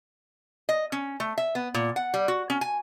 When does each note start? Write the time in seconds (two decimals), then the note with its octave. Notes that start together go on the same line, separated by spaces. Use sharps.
0.69 D#5
0.92 C#4
1.20 A3
1.38 E5
1.55 B3
1.74 A#2
1.96 F#5
2.14 G3
2.28 F#4
2.50 C#4
2.61 G#5